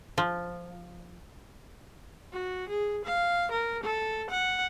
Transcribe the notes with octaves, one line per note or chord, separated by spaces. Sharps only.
F3
F#4
G#4
F5
A#4
A4
F#5